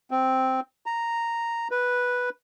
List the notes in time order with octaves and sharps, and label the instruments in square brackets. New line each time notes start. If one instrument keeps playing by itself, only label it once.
[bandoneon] C4
A#5
B4